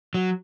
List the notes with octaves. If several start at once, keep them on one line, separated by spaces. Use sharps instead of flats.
F#3